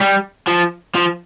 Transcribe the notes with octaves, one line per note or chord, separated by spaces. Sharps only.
G3
F3
F3